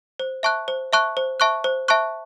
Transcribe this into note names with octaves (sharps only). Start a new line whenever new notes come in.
C5
E5 A5 C#6 F#6
C5
E5 A5 C#6 F#6
C5
E5 A5 C#6 F#6
C5
E5 A5 C#6 F#6